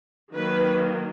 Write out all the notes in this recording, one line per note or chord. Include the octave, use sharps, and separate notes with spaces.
D#3 F#3 A#3 B4